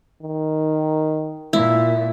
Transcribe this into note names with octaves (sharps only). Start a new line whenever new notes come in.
D#3
A#2 E4